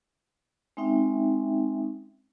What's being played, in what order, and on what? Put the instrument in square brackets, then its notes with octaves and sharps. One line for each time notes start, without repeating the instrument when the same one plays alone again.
[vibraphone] G#3 C4 C#4 D#4 E5 G5